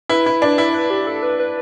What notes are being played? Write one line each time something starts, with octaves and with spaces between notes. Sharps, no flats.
E4 B4
E4
D4
E4
B4
G4
A4
B4
B4